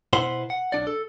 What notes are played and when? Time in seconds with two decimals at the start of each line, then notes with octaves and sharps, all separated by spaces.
0.13 B2 B3 E4 C5 F#5 C6
0.50 F#5
0.72 B1 D4 D5
0.87 A4